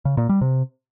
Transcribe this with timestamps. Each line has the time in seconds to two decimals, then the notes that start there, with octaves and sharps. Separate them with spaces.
0.05 C#3
0.17 A#2
0.29 G3
0.41 C3